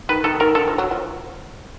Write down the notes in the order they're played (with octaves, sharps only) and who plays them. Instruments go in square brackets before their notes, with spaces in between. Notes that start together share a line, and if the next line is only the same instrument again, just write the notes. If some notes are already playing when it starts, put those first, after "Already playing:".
[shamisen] D#3 [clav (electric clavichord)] B4
[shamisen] D#3 [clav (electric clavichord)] A4
[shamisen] D#3 [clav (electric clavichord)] A#4
[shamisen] D3 [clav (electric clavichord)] A4
[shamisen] F3
F#3
F3